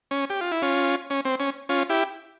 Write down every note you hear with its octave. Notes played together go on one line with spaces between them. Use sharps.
C#4
G4
F4
E4
C#4 F4
C#4
C4
C#4
C#4 F4
E4 G4